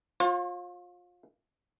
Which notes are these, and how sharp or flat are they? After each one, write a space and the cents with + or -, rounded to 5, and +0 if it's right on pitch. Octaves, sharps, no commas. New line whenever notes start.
F4 +25 C#5 -45